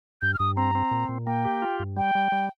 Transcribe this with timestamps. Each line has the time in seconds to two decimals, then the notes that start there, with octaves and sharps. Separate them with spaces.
0.22 G2 G6
0.34 F6
0.39 G2 D#6
0.56 C4 A#5
0.75 C4
0.91 A#2
1.09 A#2
1.26 A#3 G5
1.45 G4
1.62 F4
1.80 G2
1.97 G3 G5
2.15 G3
2.32 G3